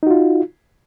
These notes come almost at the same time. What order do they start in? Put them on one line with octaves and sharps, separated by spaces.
D#4 F#4 F4